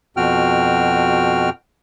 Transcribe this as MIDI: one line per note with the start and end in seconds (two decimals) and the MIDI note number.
0.17 1.50 41
0.17 1.50 47
0.17 1.50 66
0.17 1.50 79
0.17 1.50 89